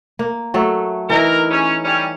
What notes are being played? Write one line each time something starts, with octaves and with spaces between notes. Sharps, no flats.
A#3
F#3 A3 A4
E3 D#4 E4 A#4
C#4
G3 C#4